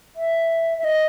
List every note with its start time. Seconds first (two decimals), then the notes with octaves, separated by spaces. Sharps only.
0.16 E5
0.78 E5
0.84 D#5